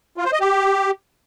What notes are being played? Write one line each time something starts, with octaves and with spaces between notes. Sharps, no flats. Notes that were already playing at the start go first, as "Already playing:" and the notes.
F4
C5
D#5
G4